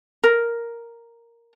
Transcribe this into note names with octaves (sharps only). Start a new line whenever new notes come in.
A#4